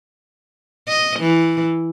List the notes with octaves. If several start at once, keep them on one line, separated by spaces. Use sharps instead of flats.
D#5
E3